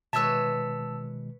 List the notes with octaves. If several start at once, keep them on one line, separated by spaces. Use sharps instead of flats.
B2 D#3 G#3 B4 C#5 E5 A5 E6